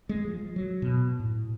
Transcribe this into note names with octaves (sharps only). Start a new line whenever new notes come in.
G#3
F3
F#3
B2
A2